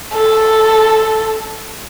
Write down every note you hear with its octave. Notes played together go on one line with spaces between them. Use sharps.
A4